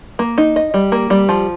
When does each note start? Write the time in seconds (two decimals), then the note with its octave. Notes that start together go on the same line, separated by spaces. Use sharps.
0.19 A#3
0.38 D#4
0.56 D#5
0.74 G3
0.92 A#3
1.10 G3
1.29 F3